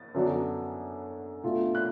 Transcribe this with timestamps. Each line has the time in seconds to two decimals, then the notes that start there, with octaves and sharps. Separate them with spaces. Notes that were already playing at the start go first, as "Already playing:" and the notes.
Already playing: A6
0.14 F#2 D3 F#3 B3 D4
1.44 B2 A3 D4 F4
1.75 F#6